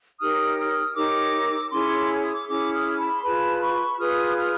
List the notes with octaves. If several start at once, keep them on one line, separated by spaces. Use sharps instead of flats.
D#4 G4 A#4 C#5 D#6 F6
D#6 F6
D#4 G4 A#4 C#5 D6 E6
C#4 E4 G#4 C#5 C6 D6
E6
D#6
D6 E6
C#4 E4 G#4 C#5 D6 E6
D#6 F6
A5 B5
C6
F4 G#4 B4 A5 B5
B5 C#6
F4 G#4 B4 D#6 F6
D#6 F6